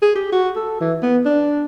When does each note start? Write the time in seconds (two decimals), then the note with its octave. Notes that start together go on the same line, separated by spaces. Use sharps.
0.02 G#4
0.15 G4
0.32 F#4
0.56 A4
0.80 E3
1.03 B3
1.26 D4